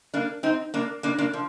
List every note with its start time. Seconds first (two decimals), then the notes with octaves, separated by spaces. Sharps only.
0.14 A#3 D4
0.43 C4 D#4
0.74 A#3 D4
1.03 A#3 D4
1.18 A#3 D4
1.33 F3